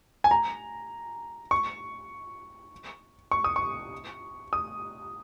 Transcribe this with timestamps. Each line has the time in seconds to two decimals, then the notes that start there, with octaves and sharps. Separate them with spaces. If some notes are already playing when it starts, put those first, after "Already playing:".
0.24 G#5
0.31 A#5
1.51 C#6
3.31 C#6
3.44 D#6
3.56 C#6
4.53 D#6